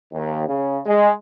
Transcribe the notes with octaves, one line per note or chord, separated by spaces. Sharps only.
D#2
C#3
G#3